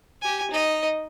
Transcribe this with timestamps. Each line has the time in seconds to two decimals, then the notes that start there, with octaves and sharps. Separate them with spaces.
0.22 G4 G#5
0.51 D#4 D#5